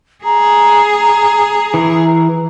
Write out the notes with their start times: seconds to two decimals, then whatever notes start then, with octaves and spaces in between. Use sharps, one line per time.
0.24 G#4 A#5
1.74 E3